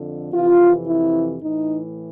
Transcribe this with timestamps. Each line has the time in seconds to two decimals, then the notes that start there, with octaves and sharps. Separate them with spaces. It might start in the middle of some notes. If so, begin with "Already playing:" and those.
Already playing: F2 D3
0.34 F2 C3 E3 F4
0.87 E4
1.41 A2 E3 D#4